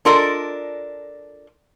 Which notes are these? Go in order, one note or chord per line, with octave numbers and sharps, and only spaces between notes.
D4 F4 A4 A#4 D5 D#5